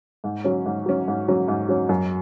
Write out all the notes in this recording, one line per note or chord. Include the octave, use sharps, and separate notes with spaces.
G#2
F#3 C#4
G#2
F#3 C#4
G#2
F#3 C#4
G#2
F#3 C#4
F#2